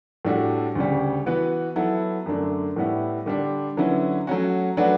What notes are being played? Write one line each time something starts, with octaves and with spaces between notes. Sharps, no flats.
A2 G3 D4 F#4 A4
D2 C#3 G3
E3 B3 F#4 B4
F#3 B3 E4 A4
F#2 D3 A3 D4
A2 G3 B3 E4
D3 G3 D4
D3 F#3 C#4 E4 B4
F#3 A3 C#4 F#4
F#3 A3 D4 F#4 B4